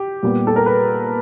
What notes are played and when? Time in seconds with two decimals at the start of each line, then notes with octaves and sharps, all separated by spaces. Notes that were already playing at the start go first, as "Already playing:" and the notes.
Already playing: G4
0.23 A#2 G3 B3
0.47 A4
0.56 A#4
0.66 B4